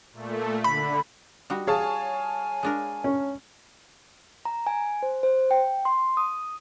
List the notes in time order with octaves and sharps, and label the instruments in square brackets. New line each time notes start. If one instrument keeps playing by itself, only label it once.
[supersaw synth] A#2 A3
[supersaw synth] D3 [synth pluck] B5
[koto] G3 D#4 F#4
[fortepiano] G#4 [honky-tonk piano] C#5 F5 A5 [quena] G#5
[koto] G#3 D4 A#4
[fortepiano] C#4
[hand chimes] A#5
G#5
C5
C5
G5
C6
D#6